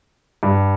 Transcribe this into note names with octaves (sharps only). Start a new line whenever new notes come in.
G2